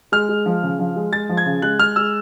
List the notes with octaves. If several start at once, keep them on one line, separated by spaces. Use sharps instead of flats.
G#3 F6
G#3
F3
C#3
F3
G#3
G#3 A6
F3
G#6
C#3
G#3 F#6
G#3 F6
G#3 E6